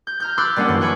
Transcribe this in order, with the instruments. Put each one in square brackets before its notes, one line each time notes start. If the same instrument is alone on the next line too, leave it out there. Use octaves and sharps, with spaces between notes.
[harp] G6
A#5 F6 G6
B5 C6 D6 E6 F#6 A6
G3 A#3 C#4 D4 F#5
F#2 E3 C7
F#5 G#5 B5 C#6 D6